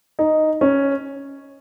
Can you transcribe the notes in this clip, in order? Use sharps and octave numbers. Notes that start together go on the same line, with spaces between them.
D#4
C#4